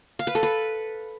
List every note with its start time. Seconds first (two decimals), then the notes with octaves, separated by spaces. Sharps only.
0.19 F5
0.27 B4
0.35 A4
0.43 B4